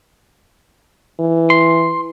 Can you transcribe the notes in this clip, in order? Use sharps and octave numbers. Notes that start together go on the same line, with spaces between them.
E3
C6